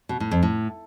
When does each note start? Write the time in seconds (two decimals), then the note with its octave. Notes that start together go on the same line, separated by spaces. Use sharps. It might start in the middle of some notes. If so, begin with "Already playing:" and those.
0.09 B2
0.20 A2
0.31 F2
0.43 A2